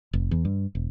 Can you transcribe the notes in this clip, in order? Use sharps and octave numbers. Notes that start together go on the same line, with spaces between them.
F1
E2
G2
E1